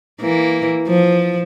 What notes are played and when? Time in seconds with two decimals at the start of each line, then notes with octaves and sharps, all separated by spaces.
0.20 E3 A#3
0.87 F3